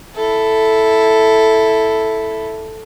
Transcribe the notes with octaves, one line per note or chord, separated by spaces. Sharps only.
E4 A4